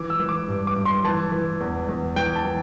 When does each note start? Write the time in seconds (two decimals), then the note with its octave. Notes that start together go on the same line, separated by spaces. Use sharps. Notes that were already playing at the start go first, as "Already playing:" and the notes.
Already playing: E3 D6
0.10 E6
0.19 E3
0.29 D6
0.48 G2
0.67 D6
0.76 G2
0.85 C6
1.04 E3 A5
1.32 E3
1.60 E2
1.89 E2
2.16 E3 G5
2.36 A5
2.45 E3